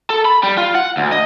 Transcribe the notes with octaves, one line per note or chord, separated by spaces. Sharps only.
A4
B5
G3
F4
F#5
D2
D#5